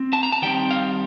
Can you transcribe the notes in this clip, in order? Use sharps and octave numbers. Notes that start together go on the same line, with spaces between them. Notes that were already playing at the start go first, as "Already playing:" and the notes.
Already playing: C4
A5
A#5
A5
D#3 G3 C4 G5
F5